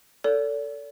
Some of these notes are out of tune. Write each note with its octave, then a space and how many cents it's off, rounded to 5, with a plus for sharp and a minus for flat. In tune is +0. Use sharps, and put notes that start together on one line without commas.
A4 +20 D5 -40